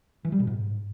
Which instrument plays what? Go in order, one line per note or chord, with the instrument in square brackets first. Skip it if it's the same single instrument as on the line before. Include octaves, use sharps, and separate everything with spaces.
[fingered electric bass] E3
G3
B2
G#2